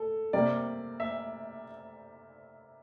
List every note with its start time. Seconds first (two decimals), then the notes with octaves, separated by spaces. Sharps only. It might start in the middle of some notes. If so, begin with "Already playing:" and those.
Already playing: A4
0.33 C3 G3 A#3 D5
1.00 E5